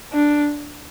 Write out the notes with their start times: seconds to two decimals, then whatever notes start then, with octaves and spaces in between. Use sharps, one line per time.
0.13 D4